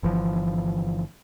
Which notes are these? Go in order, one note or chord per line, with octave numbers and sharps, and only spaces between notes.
G1 E3 F3